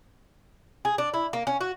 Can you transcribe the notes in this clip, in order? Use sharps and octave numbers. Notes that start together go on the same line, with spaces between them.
G#4
D4
E4
A#3
C#4
F#4